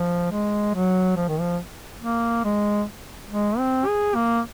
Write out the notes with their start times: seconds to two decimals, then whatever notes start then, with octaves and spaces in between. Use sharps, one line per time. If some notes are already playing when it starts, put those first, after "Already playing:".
Already playing: F3
0.32 G#3
0.74 F#3
1.17 F3
1.29 D#3
1.40 F3
2.02 A#3
2.45 G#3
3.30 G#3
3.59 C4
3.87 G#4
4.15 A#3